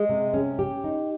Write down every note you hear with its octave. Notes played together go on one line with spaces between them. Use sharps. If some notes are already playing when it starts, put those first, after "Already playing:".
Already playing: G#3
C3
C#4
G4
D#4